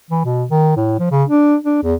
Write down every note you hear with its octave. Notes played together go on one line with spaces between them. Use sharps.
E3
B2
D#3
A2
F3
C#3
D4
D4
E2